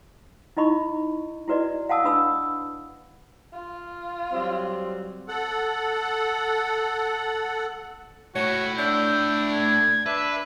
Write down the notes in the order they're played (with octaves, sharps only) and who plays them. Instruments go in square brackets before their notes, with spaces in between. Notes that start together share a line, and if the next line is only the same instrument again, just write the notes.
[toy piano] D#4 E4 D#5 B5 C#6
E4 F#4 B4 D5 D#5
F5 F#5 A5 D#6 E6
D4 B4 B5 D#6 E6
[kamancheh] F4
[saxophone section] F#3 G3 C4
[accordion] A4 F#5
[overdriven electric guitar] A2 E4 [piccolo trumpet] F#4 [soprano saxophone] C#5
[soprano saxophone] D4 [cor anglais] E5 [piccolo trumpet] G6
[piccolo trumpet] G#6
[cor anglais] D4 [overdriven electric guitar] B4 [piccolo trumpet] E5